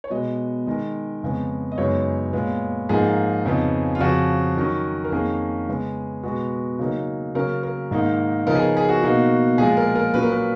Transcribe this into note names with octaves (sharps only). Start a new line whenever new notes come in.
C#5
B2 G#3 B3 D#5
D#3 G#3 D#4
F2 C#3 G#3 B3
D#5
F#2 C#3 G#3 B3 D#4 C#5
A#2 G#3 B3
G#2 F3 A#3 D#4 G#4
F2 C#3 F3 B3 D#4
F4
F2 C#3 F3 F#4
D#3 F#3 C#4
A#4
F2 D#3 A#3 C#4 G#4
C#3 G#3 B3
B2 G#3 B3 F#4
C#3 F#3 A#3 D#4
C#3 F#3 A#3 C#4 A#4
A#4
G#2 D#3 A#3 D#4
C#3 F3 B3 D#4 A#4
G#4
A#4
G#4
F#4
B2 A#3 D#4
A#2 F3 G#3 G#4
A#4
A#4
A#2 F#3 A#3 C#4 B4
A#4
B4